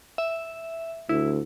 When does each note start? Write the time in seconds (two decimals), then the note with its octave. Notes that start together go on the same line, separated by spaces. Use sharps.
0.18 E5
1.09 D2 E4